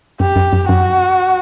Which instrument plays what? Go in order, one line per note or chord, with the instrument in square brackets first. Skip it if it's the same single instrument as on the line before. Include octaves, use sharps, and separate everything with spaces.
[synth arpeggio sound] F#2 [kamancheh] G4
[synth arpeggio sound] F#2
F#2
[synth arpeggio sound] F#2 [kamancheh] F#4